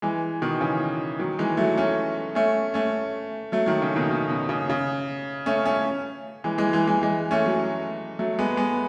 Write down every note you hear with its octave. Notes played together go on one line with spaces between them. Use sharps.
E3 G#3
B2 D#3
C#3 E3
D#3 F#3
E3 G#3
F#3 A3
A3 C#4
A3 C#4
A3 C#4
F#3 A3
D#3 F#3
C#3
B2 D#3
C#3
B2
C#3
C#3
A3 C#4
A3 C#4
E3 G#3
E3 G#3
E3 G#3
E3 G#3
E3 G#3
A3 C#4
F#3 A3
F#3 A3
G#3 B3
G#3 B3